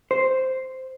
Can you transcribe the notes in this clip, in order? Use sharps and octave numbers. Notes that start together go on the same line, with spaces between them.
C5